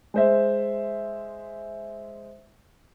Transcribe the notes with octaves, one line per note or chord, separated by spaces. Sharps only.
G#3 C5 E5